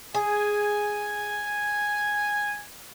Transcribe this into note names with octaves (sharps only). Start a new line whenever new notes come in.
G#4 G#5